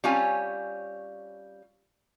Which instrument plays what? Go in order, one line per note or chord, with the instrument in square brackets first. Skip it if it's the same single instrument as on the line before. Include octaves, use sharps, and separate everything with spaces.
[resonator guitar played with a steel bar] G3 C4 C#4 F4 C#5 G#5